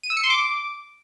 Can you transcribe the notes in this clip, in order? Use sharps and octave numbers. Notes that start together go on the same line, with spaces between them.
D#7
E6
C#7
C6
D6